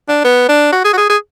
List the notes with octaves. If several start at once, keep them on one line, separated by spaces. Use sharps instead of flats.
D4
B3
D4
F#4
G#4
F#4
G#4
G#4